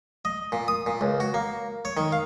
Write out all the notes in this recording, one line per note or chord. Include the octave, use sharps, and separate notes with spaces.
D#5
A#2
D#6
A#2
C#2
F#4
A#3
C#5
D#3
F5